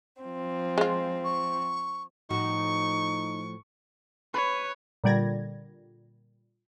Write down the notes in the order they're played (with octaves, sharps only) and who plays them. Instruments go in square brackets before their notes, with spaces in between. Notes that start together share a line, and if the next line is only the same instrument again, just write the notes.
[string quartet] F3 C4
[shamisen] G#3 F4
[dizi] C#6
[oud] A2 F3 F#4 [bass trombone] D#4 [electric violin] C#6
[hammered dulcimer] B4 [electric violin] C#5
[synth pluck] A#2 D3 G3 D5 G#6 A#6